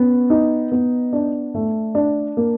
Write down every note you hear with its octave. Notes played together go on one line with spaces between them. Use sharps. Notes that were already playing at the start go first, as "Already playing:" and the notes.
Already playing: B3 C#4
D#4
B3
D4
A3
D4
A#3